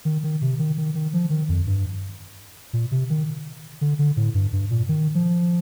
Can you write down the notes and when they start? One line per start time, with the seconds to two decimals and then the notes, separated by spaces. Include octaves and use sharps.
0.05 D#3
0.24 D#3
0.42 C3
0.59 D#3
0.78 D#3
0.95 D#3
1.13 F3
1.30 D#3
1.49 F2
1.67 G2
2.73 A#2
2.91 C3
3.10 D#3
3.81 D3
3.99 D3
4.17 A2
4.34 G2
4.53 G2
4.71 A#2
4.89 D#3
5.15 F3